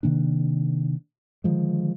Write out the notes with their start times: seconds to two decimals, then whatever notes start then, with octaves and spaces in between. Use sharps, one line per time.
0.03 C3 D#3 A#3 D4
1.44 D3 D#3 F3 G#3